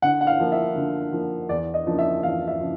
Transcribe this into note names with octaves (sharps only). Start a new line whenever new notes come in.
D3 F#5
F#5
F5
F3 A#3
E5
D3
F3 A#3
E2 D5
D#5
C#3 F3 A#3 D4
E5
E2 F5
E5
C#3 F3